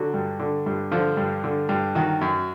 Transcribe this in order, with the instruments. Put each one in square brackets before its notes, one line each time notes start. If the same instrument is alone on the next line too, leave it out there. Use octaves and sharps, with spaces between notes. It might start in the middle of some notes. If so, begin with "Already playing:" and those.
Already playing: [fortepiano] D3 F#3 F#4
G2
D3
G2
D3 F3 F4
G2
D3
G2
D#3 F#3 F#4
F#2